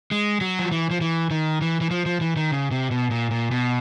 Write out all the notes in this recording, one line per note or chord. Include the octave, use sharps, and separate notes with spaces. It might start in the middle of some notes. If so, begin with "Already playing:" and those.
G#3
F#3
F3
E3
F3
E3
D#3
E3
E3
F3
F3
E3
D#3
C#3
C3
B2
A#2
A#2
B2